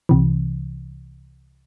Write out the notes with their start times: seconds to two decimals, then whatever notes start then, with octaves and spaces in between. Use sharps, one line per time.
0.09 C2 C3 E3